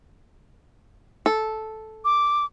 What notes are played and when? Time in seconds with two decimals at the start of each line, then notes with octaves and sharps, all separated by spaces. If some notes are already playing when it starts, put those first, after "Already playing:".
1.26 A4
2.05 D6